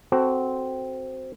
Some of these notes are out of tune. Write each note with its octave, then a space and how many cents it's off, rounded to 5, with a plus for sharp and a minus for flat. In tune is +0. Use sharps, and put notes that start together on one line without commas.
C4 +0 F#4 +15 A4 +0